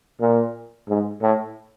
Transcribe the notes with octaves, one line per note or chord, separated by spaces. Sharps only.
A#2
G#2
A2